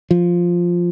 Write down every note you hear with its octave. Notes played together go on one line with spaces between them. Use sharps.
F3